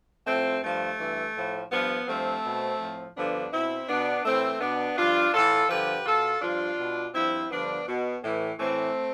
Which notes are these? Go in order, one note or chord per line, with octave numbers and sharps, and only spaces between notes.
A2 F3 A3 C4
G2 F3 A3
G2 E3
A2 F3
G2 F3 B3
G2 F3 A3 C4
B2
A2 F3
G2 D3 F3 B3 D4
B2 C4 E4
B2 B3 D4
A2 E3 A3 C4
B2 B3 D4
G2 F3 D4 F4
A2 E3 F4 A4
G2 D3 F3 G4 B4
B2 F4 A4
G2 F3 D4 F4
B2
G2 F3 C4 E4
G2 D3 F3 B3 D4
B2
A2 E3
A2 E3 A3 C4